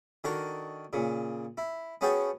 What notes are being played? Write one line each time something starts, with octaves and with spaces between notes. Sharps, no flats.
D#3 D4 F#4 A4 A#4
A#2 C#3
E4
B3 C#4 F#4 G#4 G5 A5